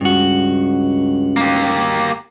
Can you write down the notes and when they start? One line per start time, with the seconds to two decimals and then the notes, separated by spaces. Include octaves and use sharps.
0.01 C#2 G2 F#4
1.37 A#3 G4